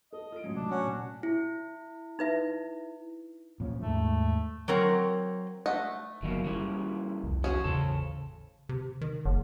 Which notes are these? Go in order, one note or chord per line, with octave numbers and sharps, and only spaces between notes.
A4 D#5
F4 D#6 D7
A1 F#2 G#3 C#4
C3 D4
C#4 F#4
A#2
E4
D#4 B4 E5
A#2 F3 C#4
D#2 G#2 A3
F#3 C4 A#4 C#5
A3 D#5 F#5
F#1 C2 B2 D#3 F#3 A#3
A#2 C#3 E3 G3
C2 F2
C#4 F#4 G#4
A1 E2 C#3 A4 C5
C3
D#3
F#1